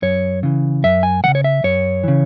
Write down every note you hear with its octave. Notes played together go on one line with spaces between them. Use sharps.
F#2 C#5
C#3 E3
F#2 E5
G#5
C#3 E3 F#5
C#5
E5
F#2 C#5
C#3 E3